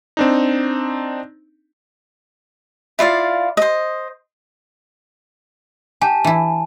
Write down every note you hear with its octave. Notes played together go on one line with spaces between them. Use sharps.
C4 D4 D#4
E4 F4 D5 F5
C5 D#5
G4 G#5 A5
E3 E4